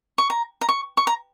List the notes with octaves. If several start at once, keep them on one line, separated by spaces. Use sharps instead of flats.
C#6
A#5
A#5
C#6
C#6
A#5